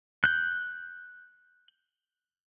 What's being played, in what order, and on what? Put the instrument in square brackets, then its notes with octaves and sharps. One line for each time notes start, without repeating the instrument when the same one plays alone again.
[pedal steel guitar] F#6 G6